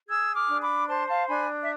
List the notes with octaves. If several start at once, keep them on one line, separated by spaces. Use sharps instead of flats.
G#4 E6 G#6
D6 F6
D4
B5 D6
C5 A5 C6
F5 A5
D4 G#5 B5
E5